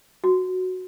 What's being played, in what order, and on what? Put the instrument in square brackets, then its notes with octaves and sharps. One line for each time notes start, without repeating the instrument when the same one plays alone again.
[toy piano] F#4